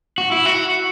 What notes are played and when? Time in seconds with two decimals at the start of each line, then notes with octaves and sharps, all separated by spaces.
0.18 F#4
0.32 E4
0.46 F#4